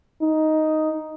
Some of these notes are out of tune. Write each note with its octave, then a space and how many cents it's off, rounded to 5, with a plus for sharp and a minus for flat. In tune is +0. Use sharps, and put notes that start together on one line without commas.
D#4 +5